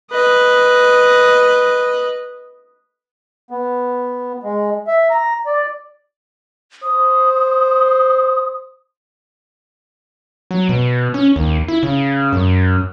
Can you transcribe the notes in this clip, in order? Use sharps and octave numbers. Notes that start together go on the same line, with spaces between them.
B4 D#5
B3
G#3
E5
A#5
D5
C5 D#6
F#3
B2
C#4
D#2
E4
C#3
F#2